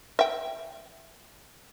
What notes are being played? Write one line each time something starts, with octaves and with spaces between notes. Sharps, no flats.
E5 G5